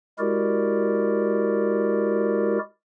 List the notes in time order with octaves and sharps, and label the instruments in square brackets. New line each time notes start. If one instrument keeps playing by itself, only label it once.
[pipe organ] G#3 E4 F#4 G4 A#4 D5